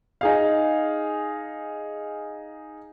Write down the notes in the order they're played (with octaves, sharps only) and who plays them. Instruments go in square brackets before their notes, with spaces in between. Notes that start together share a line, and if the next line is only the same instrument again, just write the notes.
[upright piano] D#4 G#4 F5